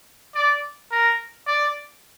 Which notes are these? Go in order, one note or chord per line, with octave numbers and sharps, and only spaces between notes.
D5
A#4
D5